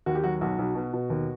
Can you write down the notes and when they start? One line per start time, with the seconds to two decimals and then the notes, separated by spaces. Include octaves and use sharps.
0.06 D#2 F#4
0.15 G4
0.23 F#3 F#4
0.41 B1 F#4
0.59 B1
0.75 B2
0.94 B2
1.10 D#2